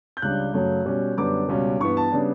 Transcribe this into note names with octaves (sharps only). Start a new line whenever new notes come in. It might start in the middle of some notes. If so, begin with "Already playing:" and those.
G6
C#2 C#3 G3 D4 F#6
F#2 C#3 F#3 A3
B2 G3 C#4
F#2 D3 G3 B3 D4 D6
C#2 B2 G3 C#4
G2 E3 B3 C#6
A5
C#3 G3 B3 D4